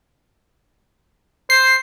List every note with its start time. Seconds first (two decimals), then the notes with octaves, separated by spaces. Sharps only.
1.50 C5 C7